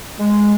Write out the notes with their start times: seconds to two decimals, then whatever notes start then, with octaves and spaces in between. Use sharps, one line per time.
0.20 G#3